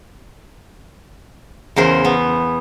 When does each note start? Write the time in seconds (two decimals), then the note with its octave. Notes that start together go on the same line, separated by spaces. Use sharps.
1.76 E2 C#3 A#4 C5
2.05 B3